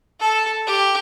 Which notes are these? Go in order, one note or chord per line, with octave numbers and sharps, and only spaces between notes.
A4
G4